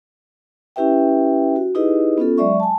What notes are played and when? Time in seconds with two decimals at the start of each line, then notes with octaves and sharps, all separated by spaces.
0.76 C#4 E4 G4 B4 E5 G5
1.56 F#4
1.75 D#4 E4 G4 G#4 B4 D#5
2.18 B3 C#4 F4 A4
2.38 F#3 G#3 D5 E5 C#6
2.60 G#5 A5